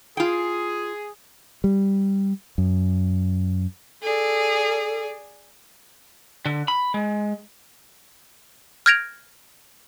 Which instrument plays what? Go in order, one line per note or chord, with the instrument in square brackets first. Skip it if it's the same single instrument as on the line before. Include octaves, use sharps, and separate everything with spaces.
[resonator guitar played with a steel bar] F4 G5 [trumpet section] G#4
[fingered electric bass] G3
F#2
[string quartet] G#4 D5 [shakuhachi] A4
[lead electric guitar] D3
B5
G#3
[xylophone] F6 G6 G#6 A#6 D7 F7